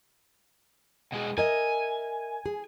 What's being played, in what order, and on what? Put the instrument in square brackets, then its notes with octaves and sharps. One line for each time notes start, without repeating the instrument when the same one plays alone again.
[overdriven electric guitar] B2 G#3
[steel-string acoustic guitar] A#4 D#5 E5 [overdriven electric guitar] G#5
[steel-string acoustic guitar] G#4